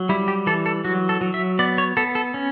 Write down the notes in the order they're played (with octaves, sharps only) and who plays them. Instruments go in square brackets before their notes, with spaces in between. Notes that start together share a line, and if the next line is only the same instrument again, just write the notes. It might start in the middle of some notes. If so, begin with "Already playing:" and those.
Already playing: [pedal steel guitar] F#3
G3 E4
G4
E3 A4
A4
F#3 F#4
A4
F#3
E5
B3 D5
C#5
B3 A4
A4
C#4